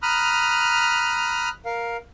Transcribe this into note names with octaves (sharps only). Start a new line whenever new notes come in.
A#5 B5 D#6 F6 F#6
A#4 F5